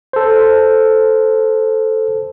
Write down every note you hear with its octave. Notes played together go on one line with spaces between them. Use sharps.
A4 C5